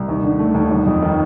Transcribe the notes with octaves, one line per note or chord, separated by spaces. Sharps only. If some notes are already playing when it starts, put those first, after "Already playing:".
Already playing: C2
D#2
D3
A3
D#2
G1
F2
D#3